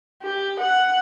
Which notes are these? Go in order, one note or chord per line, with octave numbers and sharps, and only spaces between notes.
G4
F#5